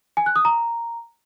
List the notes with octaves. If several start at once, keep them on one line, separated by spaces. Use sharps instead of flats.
G#5
F#6
D#6
A#5